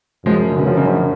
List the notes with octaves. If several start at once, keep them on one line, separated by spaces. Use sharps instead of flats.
F#2 F3 G#3
C#3
B2 D3
F#2 C#3 F3
C#3 F3
C#3 F3
C#3